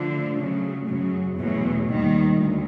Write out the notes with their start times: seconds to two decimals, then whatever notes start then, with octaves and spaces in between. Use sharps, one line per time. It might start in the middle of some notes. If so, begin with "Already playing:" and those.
Already playing: D3 F3 A3 D4
0.37 C#3 F#3 A3
0.86 F#2 C#3 F#3
1.36 E2 B2 F#3 A3
1.87 D#2 D#3 G3
2.36 D2